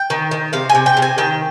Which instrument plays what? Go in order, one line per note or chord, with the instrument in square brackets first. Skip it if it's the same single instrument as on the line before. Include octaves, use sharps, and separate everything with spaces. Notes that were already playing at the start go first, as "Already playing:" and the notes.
Already playing: [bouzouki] G5
D#3
D#3
C3 F5
G#5
C3
G5
C3
G#5
D#3 G5